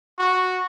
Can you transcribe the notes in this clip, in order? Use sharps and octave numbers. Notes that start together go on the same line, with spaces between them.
F#4